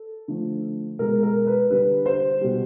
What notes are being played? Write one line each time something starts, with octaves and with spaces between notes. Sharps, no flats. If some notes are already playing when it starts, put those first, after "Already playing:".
Already playing: A4
D3 F3 A3
B2 G#3 A#4
A#4
B4
D3 G3 B4
C5
B2 G3